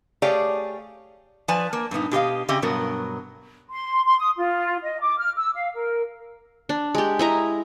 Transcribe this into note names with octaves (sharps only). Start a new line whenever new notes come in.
A3 G4 G#4 C#5 D5 F5
F3 B4 D5 G#5 A5
A#3
G2 A#2 B3 D#4
B2 G4 D#5 F5
C#3 C4 G4 D#5 E5
G2 B2 F#3 B3 A#4
C6
C6
D#6
F4
D#5
D6
F6
E6
F5
A#4
D4
G#3 G4
E4 D#5 A#5